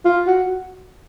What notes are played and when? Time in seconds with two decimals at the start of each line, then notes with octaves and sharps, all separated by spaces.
0.05 F4
0.27 F#4